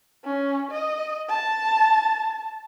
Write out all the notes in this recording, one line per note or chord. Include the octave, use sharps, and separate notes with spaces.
C#4
D#5
A5